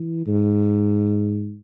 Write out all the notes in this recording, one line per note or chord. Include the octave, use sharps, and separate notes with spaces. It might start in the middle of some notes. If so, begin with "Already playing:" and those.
Already playing: E3
G#2